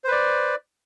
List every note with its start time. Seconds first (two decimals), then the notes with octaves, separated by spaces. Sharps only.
0.04 C5
0.08 B4
0.12 D5